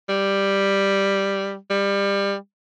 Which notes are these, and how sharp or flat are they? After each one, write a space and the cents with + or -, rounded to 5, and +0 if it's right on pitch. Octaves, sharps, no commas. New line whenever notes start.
G3 +5
G3 +25